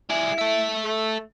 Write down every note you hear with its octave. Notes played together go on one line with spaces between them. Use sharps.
G3 E4 G#4
A4 E5
A3